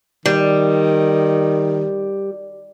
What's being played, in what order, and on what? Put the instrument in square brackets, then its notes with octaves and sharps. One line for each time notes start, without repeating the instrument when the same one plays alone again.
[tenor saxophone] D#3 [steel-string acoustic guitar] G3